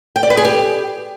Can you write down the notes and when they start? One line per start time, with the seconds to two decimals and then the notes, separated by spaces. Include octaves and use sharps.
0.16 G5
0.23 D5
0.30 B4
0.37 G#4
0.45 G4